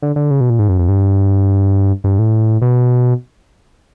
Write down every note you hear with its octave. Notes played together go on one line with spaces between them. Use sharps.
D3
D3
C#3
B2
A#2
G#2
F#2
F2
G2
G2
A2
B2